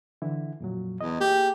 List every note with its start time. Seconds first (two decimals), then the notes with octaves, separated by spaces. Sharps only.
0.22 D3 E3 E4
0.60 F2 A#2 F#3
1.01 E2 D#5
1.21 A#3 G4 G#4